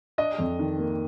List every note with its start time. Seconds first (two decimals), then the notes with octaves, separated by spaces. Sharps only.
0.18 D4 D#5
0.38 F2
0.59 D#3
0.78 A#3